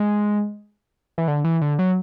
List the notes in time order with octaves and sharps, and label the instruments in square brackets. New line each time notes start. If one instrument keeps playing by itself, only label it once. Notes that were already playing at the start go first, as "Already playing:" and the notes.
Already playing: [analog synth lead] G#3
E3
D3
E3
D3
F#3